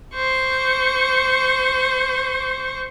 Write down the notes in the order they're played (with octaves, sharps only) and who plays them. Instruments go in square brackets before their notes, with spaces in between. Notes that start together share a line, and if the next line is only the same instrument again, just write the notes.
[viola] C5 C#6